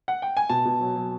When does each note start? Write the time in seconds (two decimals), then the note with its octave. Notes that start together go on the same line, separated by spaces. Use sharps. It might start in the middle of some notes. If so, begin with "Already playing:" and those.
0.08 F#5
0.22 G5
0.37 G#5
0.49 B2 A5
0.65 B2
0.81 F#3
0.96 F#3